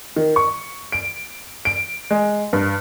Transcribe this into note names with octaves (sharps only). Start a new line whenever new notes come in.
D#3
C#6
D7
D7
G#3
G2